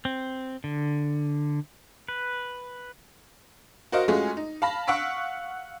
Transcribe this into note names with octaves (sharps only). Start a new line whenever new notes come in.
C4
D3
B4
F#4 A#4 C5 D#5 F5
G#3 A3 C#4 F4 F#4 G#4
D#4
F5 A5 B5 A#6
F5 F#5 C#6 E6 B6 D7